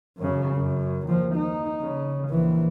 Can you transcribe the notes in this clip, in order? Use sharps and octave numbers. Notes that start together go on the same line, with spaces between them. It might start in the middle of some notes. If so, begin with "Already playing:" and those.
F#2 C#3
F#2
D#2 F3
D#4
C#3
A#1 E3